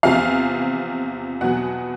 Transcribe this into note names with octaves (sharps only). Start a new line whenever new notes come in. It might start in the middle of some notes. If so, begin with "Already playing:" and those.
E2 C3 F3 F5
E2 B2 F#3 F#5